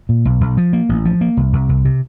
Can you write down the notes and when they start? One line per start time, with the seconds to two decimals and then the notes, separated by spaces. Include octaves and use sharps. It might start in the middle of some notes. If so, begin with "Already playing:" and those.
0.09 A#2
0.25 B1
0.41 B1
0.57 F3
0.73 A#3
0.89 A1
1.05 F3
1.21 A#3
1.37 C2
1.53 C2
1.69 C2
1.85 C3